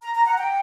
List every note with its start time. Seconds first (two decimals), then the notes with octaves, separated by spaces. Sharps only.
0.02 A#5
0.15 A#5
0.26 F#5
0.37 G5